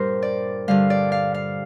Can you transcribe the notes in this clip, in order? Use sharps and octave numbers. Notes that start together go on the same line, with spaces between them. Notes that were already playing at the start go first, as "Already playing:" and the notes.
Already playing: G2 A#2 G3 A#4 C5
D5
G2 D3 G3 F5
D5
F5
F5